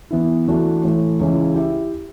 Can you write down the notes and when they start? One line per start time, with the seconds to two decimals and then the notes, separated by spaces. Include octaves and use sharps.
0.11 E3 B3 E4
0.47 E3 A3 D4 F#4
0.83 A2 E3 A3
1.19 C#2 C#3 E3
1.55 E4 G4